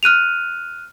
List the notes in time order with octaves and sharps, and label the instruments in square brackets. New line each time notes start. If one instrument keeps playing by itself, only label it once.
[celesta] F6 F#6 D#7 F7